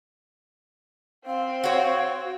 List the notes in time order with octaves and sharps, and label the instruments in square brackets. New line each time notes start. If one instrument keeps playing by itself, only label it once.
[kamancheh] C4 C5 [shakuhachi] F5
[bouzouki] F#4 C#5